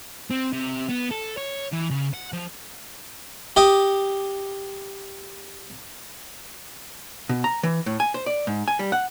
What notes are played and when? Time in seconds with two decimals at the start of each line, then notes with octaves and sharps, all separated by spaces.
0.30 C4
0.53 C3
0.89 B3
1.11 A4
1.37 C#5
1.73 E3
1.90 C#3
2.14 F#5
2.33 F3
3.56 G4 D#5 D6
7.29 B2
7.44 A#5
7.63 E3
7.86 A2
8.00 G#5
8.14 C5
8.26 D5
8.47 G#2
8.68 G#5
8.79 G3
8.92 F#5